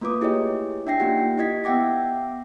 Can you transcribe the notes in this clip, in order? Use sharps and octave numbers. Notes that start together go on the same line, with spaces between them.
A3 A#3 F4 B4 D6 D#6
E4 G4 G#4 C#5 D#5
D4 E5 G5 A#6 C7
A#3 D#4 F4 G4 F#5
E4 G4 D#5 G#6 B6
B3 E5 F#5 G5 D6 A#6